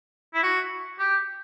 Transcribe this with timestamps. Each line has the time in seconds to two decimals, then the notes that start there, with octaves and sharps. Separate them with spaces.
0.34 E4
0.43 F#4
0.99 G4